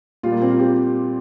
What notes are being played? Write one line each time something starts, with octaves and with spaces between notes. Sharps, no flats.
A#2 G3 F4
A#3
C4
F4
G4